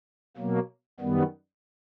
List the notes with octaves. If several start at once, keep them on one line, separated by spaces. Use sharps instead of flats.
B2 F#3 A#3
F#2 D#3 G3 B3